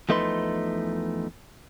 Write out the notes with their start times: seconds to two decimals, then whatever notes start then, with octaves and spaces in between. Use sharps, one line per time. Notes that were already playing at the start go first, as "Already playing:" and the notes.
0.09 E2 F3 A3 D#4 B4 C6